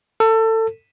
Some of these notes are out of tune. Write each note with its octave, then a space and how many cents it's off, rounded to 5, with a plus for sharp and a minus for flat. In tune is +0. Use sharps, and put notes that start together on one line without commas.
A4 +25